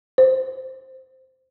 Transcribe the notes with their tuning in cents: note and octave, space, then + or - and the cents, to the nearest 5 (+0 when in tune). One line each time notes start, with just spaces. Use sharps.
C5 -10